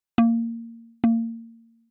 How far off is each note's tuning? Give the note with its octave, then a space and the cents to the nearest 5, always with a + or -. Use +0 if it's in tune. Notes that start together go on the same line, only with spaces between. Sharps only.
A#3 -20
A#3 -30